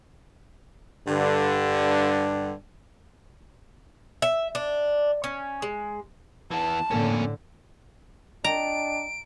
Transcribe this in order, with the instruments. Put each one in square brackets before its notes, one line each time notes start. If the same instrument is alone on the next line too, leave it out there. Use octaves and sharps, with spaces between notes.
[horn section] G2 D3
[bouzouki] E5
D4
C#4
G#3
[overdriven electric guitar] E3 B3 [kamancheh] A5
[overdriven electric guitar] F2 C#4 [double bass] A2 D3 [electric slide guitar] A#3 A4 A#4
[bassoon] D4 [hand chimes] D#5 G5 [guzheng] A#5 [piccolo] D7